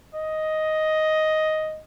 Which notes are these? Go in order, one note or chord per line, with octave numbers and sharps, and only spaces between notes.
D#5